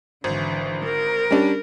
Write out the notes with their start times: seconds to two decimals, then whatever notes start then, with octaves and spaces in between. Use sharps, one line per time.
0.24 G#1 D3 E3
0.85 A#4
1.31 G3 C#4 D4